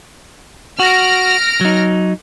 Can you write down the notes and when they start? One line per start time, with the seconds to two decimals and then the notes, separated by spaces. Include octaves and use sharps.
0.79 F#4 F6 A#6 D7
1.61 F#3 D#4